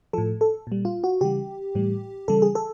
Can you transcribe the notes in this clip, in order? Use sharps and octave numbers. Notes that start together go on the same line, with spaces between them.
A2 F3 A4
A4
A#2 G3
F4
F#4
C#3 E3 G3 G4
A2 E3 G3
C#3 E3 G3 A4
G#4
A4